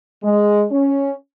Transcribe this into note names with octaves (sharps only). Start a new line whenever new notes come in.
G#3
C#4